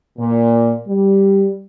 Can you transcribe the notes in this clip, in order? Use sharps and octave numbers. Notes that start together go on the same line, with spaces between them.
A#2
G3